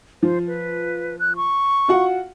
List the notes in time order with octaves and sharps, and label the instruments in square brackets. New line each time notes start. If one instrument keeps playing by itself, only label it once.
[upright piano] F3 [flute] C5
[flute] B4
F#6
C#6
[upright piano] F4 F#4 F#5